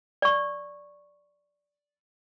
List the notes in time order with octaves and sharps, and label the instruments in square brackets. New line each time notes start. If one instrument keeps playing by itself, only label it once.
[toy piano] D5 C#6